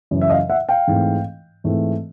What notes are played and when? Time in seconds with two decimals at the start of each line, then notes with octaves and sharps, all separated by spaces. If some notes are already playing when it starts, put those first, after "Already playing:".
0.11 F#2 C#3 E3
0.21 E5
0.30 D#5 F5
0.49 E5 F#5
0.69 F5 G5
0.87 G#2 E3 A3 C4
1.64 G#2 E3 A3 C4